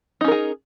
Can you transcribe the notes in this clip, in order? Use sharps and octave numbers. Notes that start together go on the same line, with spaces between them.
C#4 D#4 G#4 A#4